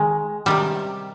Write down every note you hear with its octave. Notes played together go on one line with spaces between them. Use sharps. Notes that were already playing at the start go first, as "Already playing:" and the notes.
Already playing: D#3 G#3
C3 D#3 G3